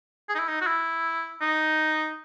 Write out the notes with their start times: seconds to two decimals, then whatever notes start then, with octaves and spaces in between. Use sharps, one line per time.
0.29 G#4
0.35 D#4
0.39 E4
0.48 D#4
0.61 F#4
0.67 E4
1.41 D#4